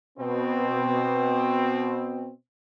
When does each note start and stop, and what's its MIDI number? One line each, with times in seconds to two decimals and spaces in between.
0.19 2.30 47
0.19 2.30 60